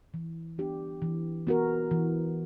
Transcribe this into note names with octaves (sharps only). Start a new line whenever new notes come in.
E3
B3 D4 G4
E3
B3 F#4 A#4
E3